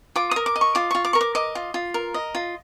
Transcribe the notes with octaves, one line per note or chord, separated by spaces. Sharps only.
F4 D6
A#4 D#6
D6
D#5
C#6
F4 D6
F4 C#6
D6
A#4 C#6
D6
D#5 D6
F4
F4
A#4
D#5
F4